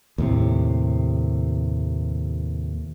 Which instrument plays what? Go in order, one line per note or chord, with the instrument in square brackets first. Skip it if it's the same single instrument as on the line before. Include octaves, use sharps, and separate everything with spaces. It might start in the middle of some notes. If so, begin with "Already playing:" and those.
[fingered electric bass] D#2 A2 C3